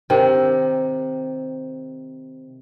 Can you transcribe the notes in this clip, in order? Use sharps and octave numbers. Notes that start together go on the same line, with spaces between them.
C3 D#3